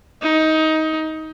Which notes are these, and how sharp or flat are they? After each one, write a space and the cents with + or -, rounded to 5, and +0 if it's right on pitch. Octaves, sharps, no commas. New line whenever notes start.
D#4 +20